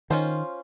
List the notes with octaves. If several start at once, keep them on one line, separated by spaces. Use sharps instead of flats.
D#3 C#4 F4 C5